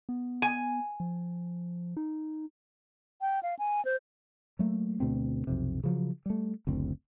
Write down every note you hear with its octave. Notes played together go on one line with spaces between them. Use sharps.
B3
G#5
F3
D#4
G5
F5
G#5
C5
F#3 A3 A#3
D2 B2 A3 C4
B1 F2 C3
C#3 F3 F#3
G3 A3
F#1 D2 C4